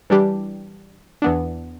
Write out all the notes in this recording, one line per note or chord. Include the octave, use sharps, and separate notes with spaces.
E3 G3 D4 G4
E2 E3 B3 D4